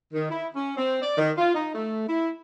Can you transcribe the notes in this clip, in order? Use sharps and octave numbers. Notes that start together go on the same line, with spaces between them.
D#3
E4
C#4
C4
D5
D#3
F4
D#4
A3
E4